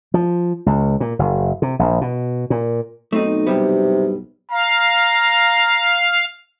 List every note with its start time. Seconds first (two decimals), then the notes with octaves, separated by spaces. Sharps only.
0.14 F3
0.66 C#2
1.00 A#2
1.19 F#1
1.62 C3
1.79 A#1
2.01 B2
2.50 A#2
3.13 B1 A3 C4 D#4
3.47 G2 C3 G3 B3
4.51 F5 A#5